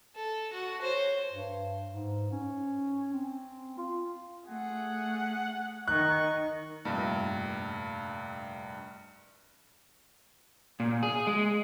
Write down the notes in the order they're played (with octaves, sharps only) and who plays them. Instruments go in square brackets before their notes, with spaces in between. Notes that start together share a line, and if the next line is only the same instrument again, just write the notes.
[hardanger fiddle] A4
F#4
C5 C#5
[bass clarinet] G2
G#2
C#4
C4
F4
[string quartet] A3 G#4 [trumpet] F#5
[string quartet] D#3 [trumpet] C#6 [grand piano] F#6
[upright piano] F1 A#1 G2
[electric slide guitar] A#2
G#4
G#3